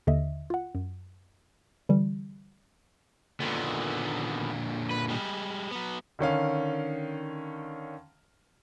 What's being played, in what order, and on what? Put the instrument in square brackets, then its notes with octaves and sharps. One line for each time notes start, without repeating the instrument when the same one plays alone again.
[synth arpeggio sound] D#2 D3 D#5 E5
F4 F#5
F#2
D3 E3 G3
[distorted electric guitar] A#2 D3 [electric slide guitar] D#3 B3
[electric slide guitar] B4
G3 G#3 G4
F#3 B3
[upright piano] D3 D#3 C#4 F5